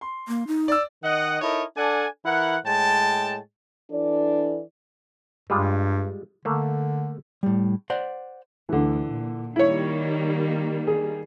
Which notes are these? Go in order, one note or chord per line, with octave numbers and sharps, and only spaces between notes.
C6
A#3
D#4
D5 E6
D#3 D#5 F#5
D#4 E4 A4 A#4 C#5 D#5
D4 A4 D5 F#5 G#5
E3 E4 A#4 F#5
A2 G#3 C#5 G5 A5
E3 D4 A4 D5
G2 G3 G#3 F4
D3 A3 A#3
A2 G3
C5 D5 F#5
D2 D3 E3
A#2
D#3 G3 A#3 E4 C#5
G#4